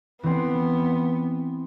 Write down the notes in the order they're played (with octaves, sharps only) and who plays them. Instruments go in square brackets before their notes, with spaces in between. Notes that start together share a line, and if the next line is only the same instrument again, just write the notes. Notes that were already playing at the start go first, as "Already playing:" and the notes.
[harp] E3 C4 [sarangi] B3